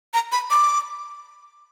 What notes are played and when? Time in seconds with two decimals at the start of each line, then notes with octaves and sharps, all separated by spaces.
0.14 A#5
0.32 B5
0.50 D6